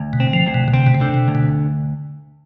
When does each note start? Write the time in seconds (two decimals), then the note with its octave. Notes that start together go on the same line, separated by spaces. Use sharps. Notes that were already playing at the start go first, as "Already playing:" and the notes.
Already playing: D2
0.13 B2
0.20 C4
0.33 F3
0.46 D2
0.54 B2
0.68 B2
0.73 C3 C4
0.87 B2
0.95 C3
1.01 D3
1.14 B2
1.28 D2
1.35 B2